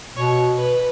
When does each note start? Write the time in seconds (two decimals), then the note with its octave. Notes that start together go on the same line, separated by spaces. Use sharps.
0.16 B2 C#5
0.57 B4